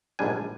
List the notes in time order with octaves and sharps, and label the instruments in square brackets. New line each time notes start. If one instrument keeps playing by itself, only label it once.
[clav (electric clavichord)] A#1 G#2 G3 D4 G#5